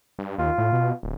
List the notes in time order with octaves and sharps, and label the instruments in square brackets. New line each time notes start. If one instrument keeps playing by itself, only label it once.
[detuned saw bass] G2
[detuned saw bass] D#2 [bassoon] F4
[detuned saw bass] A2
B2
D1